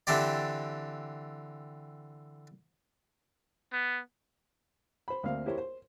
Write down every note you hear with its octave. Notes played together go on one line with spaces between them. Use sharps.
D3 E3 C4 G4 D5
B3
C5 B5
D2 A#3 C4 F5
E4 G4 A#4 C5 C#5
C5